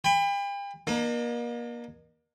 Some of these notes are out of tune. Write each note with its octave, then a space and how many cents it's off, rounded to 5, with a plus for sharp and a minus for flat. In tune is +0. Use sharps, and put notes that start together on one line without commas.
G5 +40 B5 +20
A#3 +35 D#4 -40